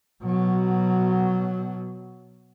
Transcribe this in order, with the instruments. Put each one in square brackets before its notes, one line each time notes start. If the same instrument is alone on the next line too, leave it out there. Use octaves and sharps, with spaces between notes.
[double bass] B2 F#3